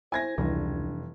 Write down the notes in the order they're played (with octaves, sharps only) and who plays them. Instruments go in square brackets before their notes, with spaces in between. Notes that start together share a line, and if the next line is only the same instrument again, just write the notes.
[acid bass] E4 [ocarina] C5 [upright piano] G#5 G#6 A#6
[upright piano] F1 [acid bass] C#2 [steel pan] E3 G3 [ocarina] D4